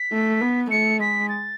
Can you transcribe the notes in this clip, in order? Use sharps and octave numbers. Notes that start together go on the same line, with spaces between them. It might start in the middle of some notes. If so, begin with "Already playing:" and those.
Already playing: B6
A3
B3
A3 C#7
G#3 B6
A6